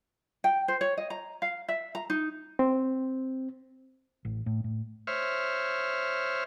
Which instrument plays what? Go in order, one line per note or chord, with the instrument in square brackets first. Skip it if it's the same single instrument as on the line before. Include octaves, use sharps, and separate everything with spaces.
[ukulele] G5
C5
C#5
D#5
A#5
F5
E5
A#5
D#4
[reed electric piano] C4
[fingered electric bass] A1
A2
A2
[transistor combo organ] C5 C#5 E5 F6